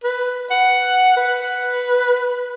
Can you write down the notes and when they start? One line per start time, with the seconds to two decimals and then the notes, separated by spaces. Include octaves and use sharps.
0.04 B4
0.51 F#5
1.17 B4